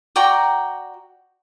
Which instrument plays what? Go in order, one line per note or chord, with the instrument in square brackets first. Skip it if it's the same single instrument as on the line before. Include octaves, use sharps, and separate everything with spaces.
[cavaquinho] F#4 D5 G5 A#5